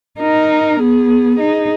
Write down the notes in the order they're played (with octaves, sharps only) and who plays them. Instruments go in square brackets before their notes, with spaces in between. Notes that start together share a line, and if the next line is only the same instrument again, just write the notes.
[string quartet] D#4 [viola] A#4
[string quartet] B3 [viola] G#4
[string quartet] D#4 [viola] G#4